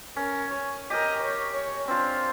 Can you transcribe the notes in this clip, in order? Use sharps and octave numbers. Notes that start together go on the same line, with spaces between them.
C#4 A#4
C#4 C#5
G4 A#4 D#5
C#5
C#5
C4 D4 F4